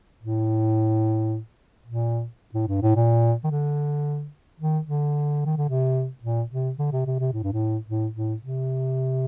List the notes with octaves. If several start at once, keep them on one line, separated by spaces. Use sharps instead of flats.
A2
A#2
A2
G2
A2
A#2
D#3
D3
D#3
D3
D#3
D3
C3
A#2
C3
D3
C3
C3
C3
A2
G2
A2
A2
A2
C3